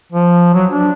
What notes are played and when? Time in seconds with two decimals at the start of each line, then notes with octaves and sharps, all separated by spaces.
0.12 F3
0.54 F#3
0.70 D4